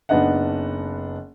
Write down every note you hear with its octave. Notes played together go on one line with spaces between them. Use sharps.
F#1 B3 D4 D#4 D#5 F#5